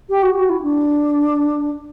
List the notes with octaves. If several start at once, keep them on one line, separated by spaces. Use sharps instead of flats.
G4
F#4
F#4
E4
D4